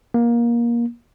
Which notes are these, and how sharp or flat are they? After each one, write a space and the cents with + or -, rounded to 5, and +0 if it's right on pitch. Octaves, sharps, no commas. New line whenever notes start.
A#3 +20